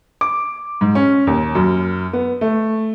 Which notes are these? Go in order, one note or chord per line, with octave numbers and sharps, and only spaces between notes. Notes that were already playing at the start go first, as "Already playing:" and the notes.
D6
G#2
C#4
D#2
F#2
B3
A3